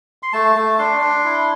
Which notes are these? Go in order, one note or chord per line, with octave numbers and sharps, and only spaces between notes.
C6
A3 A5
A3
D4 C6
D4
E4